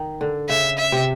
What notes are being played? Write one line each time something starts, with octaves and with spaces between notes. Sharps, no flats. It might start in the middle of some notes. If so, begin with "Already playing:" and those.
Already playing: D#3
D3
C#3 E5
E5
C3